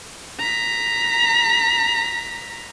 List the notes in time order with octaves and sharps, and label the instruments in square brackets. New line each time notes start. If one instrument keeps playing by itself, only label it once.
[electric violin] A#5 B6